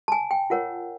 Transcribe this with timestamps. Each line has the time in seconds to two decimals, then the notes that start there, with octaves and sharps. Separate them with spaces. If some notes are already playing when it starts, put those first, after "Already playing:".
0.08 A5
0.12 G#5
0.31 G5
0.50 F4 A#4 C#5 F#5